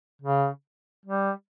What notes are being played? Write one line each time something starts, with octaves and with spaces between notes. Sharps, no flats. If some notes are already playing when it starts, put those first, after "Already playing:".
C#3
G3